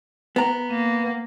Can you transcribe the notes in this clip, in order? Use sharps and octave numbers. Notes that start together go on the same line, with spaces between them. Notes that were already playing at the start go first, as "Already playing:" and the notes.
B3 A#5
A#3